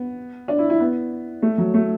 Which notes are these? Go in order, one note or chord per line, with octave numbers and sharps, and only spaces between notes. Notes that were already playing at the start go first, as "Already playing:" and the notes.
Already playing: B3
D4
E4
E4
B3
A3
F#3
A3